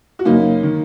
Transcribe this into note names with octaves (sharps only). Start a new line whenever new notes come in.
F#4
F#2 C#3 A#3 D#4
D#3